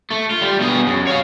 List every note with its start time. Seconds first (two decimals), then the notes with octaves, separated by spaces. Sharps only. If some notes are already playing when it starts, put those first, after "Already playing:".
0.11 A3
0.31 F4
0.42 G3
0.61 B2 G#4
0.87 F#2
1.07 C#5 F5